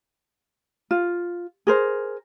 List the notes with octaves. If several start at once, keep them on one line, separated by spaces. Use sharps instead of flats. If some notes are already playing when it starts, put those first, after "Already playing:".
F4
G#4 A#4 C5